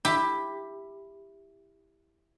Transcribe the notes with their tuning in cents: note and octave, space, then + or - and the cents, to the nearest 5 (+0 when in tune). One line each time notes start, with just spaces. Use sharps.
E4 +0 G4 +10